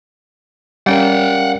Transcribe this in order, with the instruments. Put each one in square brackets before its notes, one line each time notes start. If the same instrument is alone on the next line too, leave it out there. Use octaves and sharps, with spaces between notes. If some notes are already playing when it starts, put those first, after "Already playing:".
[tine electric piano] G3 C#4 A#4 [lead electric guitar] F#5 G5